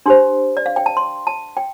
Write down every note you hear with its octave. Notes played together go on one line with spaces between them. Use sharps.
D4 G4 C5 C6
D5
F5
G5
A5
C6
A5
G5